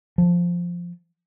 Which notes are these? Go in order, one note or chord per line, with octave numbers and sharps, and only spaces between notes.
F3